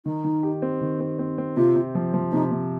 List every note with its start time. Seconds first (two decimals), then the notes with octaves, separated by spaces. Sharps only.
0.06 D#3 D#4
0.24 D#3
0.43 G4
0.62 C4
0.81 D#3
1.00 C4
1.19 C4
1.38 C4
1.57 C3 F4
1.76 C3
1.95 F3
2.14 F3
2.32 C3 D#4
2.51 C3